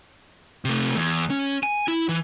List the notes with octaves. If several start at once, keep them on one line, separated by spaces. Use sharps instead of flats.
C3 A3
E2
C#4
G#5
E4
E3